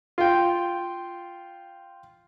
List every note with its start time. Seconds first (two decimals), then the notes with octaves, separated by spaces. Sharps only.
0.18 F4 G5